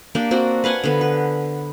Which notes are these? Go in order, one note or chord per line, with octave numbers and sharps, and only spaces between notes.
A#3 D4 G4
C4 D4 F#4
B4 F5 F#5 G#5
D3 B3
B4